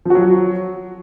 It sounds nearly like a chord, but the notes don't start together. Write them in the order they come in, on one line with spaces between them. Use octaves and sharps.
F3 F#4 F#3